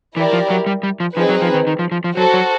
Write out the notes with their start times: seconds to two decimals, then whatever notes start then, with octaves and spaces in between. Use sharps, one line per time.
0.16 E3 E4 G4 A#4 D5
0.33 F3
0.50 F#3
0.67 G3
0.83 G3
1.00 F3
1.16 F3 C4 D#4 G#4 B4
1.29 F#3
1.42 F3
1.54 D#3
1.67 D#3
1.79 F3
1.92 F3
2.04 F3
2.17 F#3 F#4 A4 C5
2.34 F#3